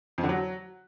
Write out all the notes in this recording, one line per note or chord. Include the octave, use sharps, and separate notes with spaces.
F2
D3
F#3